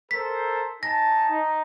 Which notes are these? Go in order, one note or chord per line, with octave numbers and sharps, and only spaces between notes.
A4 A#4 C5 B6
D#4 G#5 A5 A#6
D#4